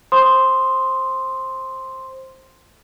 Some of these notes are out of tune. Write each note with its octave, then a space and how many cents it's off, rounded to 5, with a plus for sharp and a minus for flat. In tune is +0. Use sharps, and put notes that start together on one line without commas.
C5 +15 C6 +0 D#6 +0